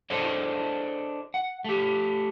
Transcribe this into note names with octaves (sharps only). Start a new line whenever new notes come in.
D4 G#4 A4 C5 C#5 D#5
F#5
A3 G4